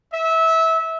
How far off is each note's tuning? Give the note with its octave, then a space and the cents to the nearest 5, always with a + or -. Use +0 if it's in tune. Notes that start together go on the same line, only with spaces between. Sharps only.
E5 -20